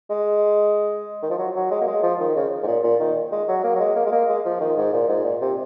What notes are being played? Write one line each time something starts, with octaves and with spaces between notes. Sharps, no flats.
G#3
D#3
F3
F#3
F#3
G#3
A#3
G#3
F3
D#3
C#3
G#2
A#2
A#2
D#3
G#3
F#3
A#3
F#3
G#3
A#3
G#3
A#3
G#3
F3
D#3
G#2
A#2
G#2
A#2
C3